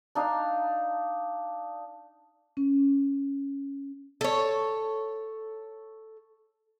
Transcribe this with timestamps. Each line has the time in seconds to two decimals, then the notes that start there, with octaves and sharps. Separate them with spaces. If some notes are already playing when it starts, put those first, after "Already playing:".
0.15 D4 D#4 F5
2.57 C#4
4.21 A4 C#5